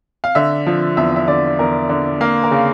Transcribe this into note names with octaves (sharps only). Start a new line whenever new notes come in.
F5
D3 E5
F3
E2 E5
E5
D3 D5
E2 A#4
D3
A#3 F5
A#4
C#3